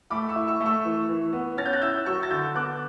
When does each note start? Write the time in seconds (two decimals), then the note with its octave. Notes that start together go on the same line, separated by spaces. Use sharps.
0.10 A3 B5 D6
0.29 C#6 E6
0.36 E4
0.47 C#6 E6
0.60 A3
0.66 C#6 E6
0.85 E3
1.09 E3
1.33 B3
1.57 C#4 A6
1.66 G6
1.73 F#6 A6
1.82 E4 E6 G6
2.06 F#3 C#6 E6
2.23 A6
2.30 D3 E6 G6
2.55 B3 D6 F#6